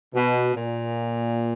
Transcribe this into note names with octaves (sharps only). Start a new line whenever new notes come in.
B2
A#2